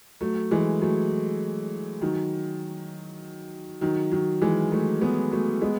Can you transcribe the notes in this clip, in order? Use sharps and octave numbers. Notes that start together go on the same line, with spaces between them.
F#3 A3
E3 G#3
F#3 A3
D#3 F#3
D#3 F#3
D#3 F#3
E3 G#3
F#3 A3
G#3 B3
F#3 A3
G#3 B3